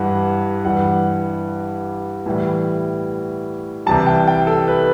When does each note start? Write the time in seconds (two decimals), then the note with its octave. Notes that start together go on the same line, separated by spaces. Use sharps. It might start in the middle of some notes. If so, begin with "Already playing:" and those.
Already playing: G2 E3 G3 F#5
0.65 G2 E3 G3 F#5
2.26 A2 E3 G3
3.86 C2 C3 E3 G3 A5
4.06 G5
4.27 G5
4.47 A4
4.68 B4